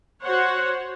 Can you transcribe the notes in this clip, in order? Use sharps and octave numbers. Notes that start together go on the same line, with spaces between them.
F#4 C5 C#5 F#5